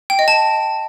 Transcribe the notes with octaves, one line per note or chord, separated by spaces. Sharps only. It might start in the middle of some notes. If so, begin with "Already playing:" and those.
G5
D#5
A5